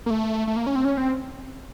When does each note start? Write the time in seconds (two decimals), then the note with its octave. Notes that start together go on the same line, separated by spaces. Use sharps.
0.06 A#3
0.10 A3
0.47 A3
0.56 A#3
0.67 C#4
0.76 C4
0.85 C#4
0.97 C4